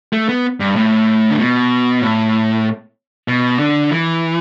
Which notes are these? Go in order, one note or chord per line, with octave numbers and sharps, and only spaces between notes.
A3
B3
G2
A2
D3
B2
A2
B2
D3
E3